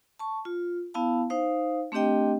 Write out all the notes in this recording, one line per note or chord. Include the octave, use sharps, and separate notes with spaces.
A5 C#6
F4
B3 E4 F5 A5
D#4 C5 F5
A3 C4 D4 G4 D#5 G5